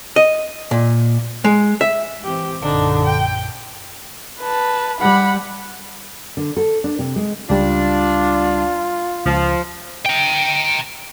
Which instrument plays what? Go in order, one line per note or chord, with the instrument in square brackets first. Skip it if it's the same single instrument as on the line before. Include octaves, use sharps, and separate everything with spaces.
[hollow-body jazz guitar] D#5
A#2
G#3
E5
[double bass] E3 C4 [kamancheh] G4
[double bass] A#1 F#2 [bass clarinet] D3 [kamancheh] D4 D#4
[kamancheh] G5
B4 A5
[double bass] G3 [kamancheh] F#5 B5
[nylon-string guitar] D3
A4
D4
C3
G#3
[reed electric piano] C#2 G3 [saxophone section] D4 [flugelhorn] F4
[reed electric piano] C#2 [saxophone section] F3
[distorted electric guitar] G5 A#5